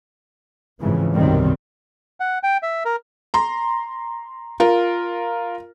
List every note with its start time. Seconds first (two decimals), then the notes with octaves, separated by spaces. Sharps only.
0.80 G1 F2 G#2 C#3 E3
1.14 B1 F#2 C3 D#3 G3 C4
2.20 F#5
2.43 G5
2.63 E5
2.85 A#4
3.34 A#5 C6
4.60 F4 A#4